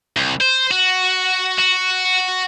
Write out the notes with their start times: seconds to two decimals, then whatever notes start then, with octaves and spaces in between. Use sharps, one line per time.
0.17 C2
0.41 C5
0.71 F#4
1.58 F#4